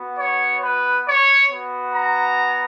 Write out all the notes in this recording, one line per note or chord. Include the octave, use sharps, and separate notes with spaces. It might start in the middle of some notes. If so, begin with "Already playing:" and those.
Already playing: B3 F#4
C#5
B4
C#5
B3 F#4
A#5